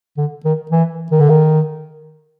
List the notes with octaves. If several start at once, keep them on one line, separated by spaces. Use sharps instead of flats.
D3
D#3
E3
D#3
D3
D#3